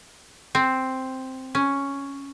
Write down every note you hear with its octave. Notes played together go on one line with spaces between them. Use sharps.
C4
C#4